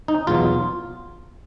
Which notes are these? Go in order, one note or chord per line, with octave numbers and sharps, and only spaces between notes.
D#4
E2 B2 F#3 F4